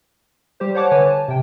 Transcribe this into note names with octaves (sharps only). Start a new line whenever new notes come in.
G3 G4 C5
C5 C#5 F#5 A5 D6
D3 B4 C#5 G#5
A5
C3 G5